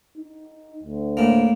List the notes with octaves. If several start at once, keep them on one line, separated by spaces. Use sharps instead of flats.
D#4
D2
A2 A#3